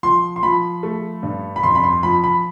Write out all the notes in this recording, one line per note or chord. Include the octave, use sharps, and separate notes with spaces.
F3 C6
C6
F3 B5
A3
G2
B5
F2 C6
B5
C6
F3 B5
B5